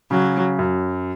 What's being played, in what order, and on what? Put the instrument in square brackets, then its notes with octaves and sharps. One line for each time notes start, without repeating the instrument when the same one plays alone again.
[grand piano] C#3 [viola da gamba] F#3
[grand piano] F#2